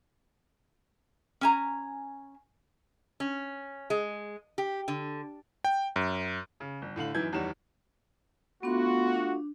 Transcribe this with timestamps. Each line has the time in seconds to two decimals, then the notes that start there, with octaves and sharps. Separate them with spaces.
1.41 C#4 G#5 A#5
3.20 C#4
3.90 G#3
4.58 G4
4.88 D3
5.64 G5
5.96 F#2
6.60 C#3
6.82 G1
6.96 A2 D3 F5 F#7
7.15 F#2 D#3 E3 E4 G6 G#6
7.32 G1 E2 D#3 G3 C#5 E7
8.63 A3 B3 D4 F4 F#4 C6
9.14 D4